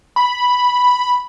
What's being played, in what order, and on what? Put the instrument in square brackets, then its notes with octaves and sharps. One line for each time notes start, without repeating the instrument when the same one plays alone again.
[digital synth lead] B5